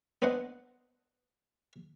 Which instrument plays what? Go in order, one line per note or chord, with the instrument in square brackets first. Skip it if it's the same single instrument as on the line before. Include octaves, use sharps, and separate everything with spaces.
[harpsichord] B3 D4 C5 D#5 F#5